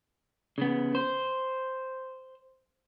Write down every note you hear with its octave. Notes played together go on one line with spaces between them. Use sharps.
C#3 B3
C5